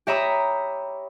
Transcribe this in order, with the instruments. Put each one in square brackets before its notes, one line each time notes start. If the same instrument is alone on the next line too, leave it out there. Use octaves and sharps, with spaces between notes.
[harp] G4 C#5 E5 A#5 B5 D#6